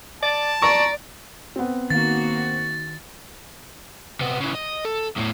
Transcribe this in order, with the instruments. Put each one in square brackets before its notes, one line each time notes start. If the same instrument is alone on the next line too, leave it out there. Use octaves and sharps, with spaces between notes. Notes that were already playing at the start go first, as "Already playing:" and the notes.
[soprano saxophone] D5 [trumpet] A5
[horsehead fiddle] D5 [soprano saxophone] A#5 [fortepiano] C#6
[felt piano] B3 C4
[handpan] D#3 [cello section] A#3 F#4 [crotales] A6
[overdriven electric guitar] C3 B3
C#3 E3
D#5
A4
E2 A2